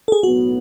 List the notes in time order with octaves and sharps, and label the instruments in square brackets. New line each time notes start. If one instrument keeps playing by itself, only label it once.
[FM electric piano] A4
G#4
[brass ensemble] B1 A2 F#3 B3 [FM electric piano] F#4